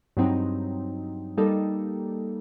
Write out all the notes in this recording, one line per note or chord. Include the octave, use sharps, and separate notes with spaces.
G2 F#3 C4 D#4
G3 A#3 D#4 A4